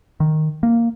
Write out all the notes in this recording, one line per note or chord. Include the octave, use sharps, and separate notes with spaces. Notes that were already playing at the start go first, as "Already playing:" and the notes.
D#3
A#3